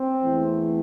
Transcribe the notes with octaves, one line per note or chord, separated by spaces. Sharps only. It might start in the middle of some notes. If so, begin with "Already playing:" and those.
Already playing: C4
E2 E3 A3